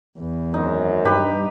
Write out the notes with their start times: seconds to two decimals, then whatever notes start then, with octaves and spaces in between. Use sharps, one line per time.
0.19 E2
0.54 G#1 F#2 D#4
1.05 G2 D#4 G4 B4 B5